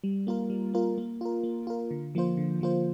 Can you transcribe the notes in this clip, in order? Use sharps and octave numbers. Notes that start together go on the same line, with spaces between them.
G3
A#3 F4 A#4
G3
A#3 F4 A#4
A#3
F4 A#4
A#3
F4 A#4
D3
F3 A#3 F4 C5
D3
F3 A#3 F4 C5